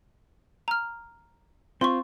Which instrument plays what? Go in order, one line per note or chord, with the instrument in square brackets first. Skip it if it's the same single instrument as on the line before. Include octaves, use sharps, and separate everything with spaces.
[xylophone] A#5 F6
[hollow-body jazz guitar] C4 F4 [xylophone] C6 C#6